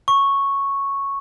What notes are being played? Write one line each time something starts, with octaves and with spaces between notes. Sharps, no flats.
C#6